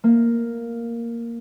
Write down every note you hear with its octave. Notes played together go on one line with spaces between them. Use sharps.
A#3